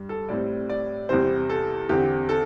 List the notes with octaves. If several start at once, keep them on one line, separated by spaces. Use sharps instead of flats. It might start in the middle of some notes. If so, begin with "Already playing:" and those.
Already playing: G2 G3
A4
A2 G3 C4 D5
D5
E2 C3 G3 C4 C5
A4
E2 D3 C4 G4
A4